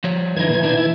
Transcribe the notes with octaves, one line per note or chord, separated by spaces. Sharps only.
F3 G3 C#5
F#2 D3 E3 D#4 G#6
A#2 D#3
B2 D4 D#4
E4